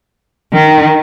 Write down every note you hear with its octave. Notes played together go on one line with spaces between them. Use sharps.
D#3